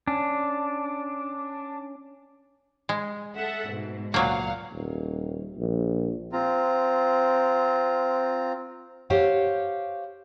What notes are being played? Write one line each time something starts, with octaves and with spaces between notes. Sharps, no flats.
C#4 D4
G#3
A4 E5 F#5
G#2 B2
C#2 A#2 F#3 A#3 F5 F#5
D#1
A#1
C4 F4 A#5
G4 C5 C#5 F5 F#5